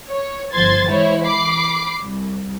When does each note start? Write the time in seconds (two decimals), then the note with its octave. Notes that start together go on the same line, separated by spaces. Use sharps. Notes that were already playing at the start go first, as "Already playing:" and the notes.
0.10 C#5
0.53 G1 F3 C5 C6 G#6 A6
0.88 E3 G#3 E4 C5 C#5
1.25 B5 D6 C7
2.03 C2